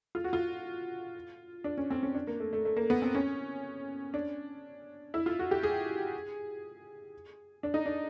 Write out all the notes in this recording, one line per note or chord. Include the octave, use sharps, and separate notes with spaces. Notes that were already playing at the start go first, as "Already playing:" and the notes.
F4
F#4
F4
D4
C#4
C4
C#4
D4
A#3
A3
A3
A3
A#3
B3
C4
C#4
D4
E4
F4
F#4
G4
G#4
D4
D#4
D4